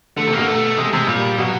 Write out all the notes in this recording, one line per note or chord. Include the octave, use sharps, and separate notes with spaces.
D3 A3
C3
B2 A#3
A3
C3 G#3
C3 G#3
A#2 G3
B2 F#3